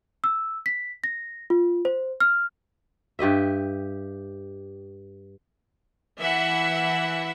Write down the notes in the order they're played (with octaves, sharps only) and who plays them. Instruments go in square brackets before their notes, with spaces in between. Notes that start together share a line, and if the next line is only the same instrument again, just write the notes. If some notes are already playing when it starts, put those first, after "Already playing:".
[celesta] E6
B6
A#6
F4
C5
F6
[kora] G2 G4 D#5 E5
[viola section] E3 E5 F#5